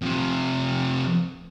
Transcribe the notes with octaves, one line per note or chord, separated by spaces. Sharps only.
F2 C3